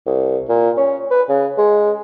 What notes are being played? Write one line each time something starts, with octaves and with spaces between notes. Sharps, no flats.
C2
A#2
C#4
B4
C#3
G#3